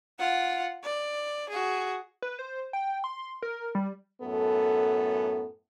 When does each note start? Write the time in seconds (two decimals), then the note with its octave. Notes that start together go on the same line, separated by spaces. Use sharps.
0.19 F4 F#5
0.83 D5
1.50 F#4 G#4
2.22 B4
2.39 C5
2.73 G5
3.04 C6
3.42 A#4
3.75 G3
4.21 F#2 A2 B3 A4